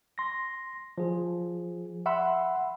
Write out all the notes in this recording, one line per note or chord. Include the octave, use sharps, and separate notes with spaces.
C6 A#6
F3 G#4
E5 F#5 B5 C6 E6